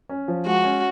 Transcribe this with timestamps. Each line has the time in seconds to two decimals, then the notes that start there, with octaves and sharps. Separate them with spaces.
0.09 C#4
0.28 F3
0.46 G#3 F#4
0.64 C#4